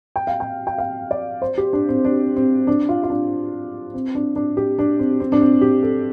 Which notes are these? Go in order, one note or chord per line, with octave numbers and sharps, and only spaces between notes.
G5
F5
G5
G5
F5
D5
C5
G4
D4
C4
D4
C4
D4
F4
F4
D4
C4
D4
D4
G4
D4
C4
C4
D4
C4
G4
A4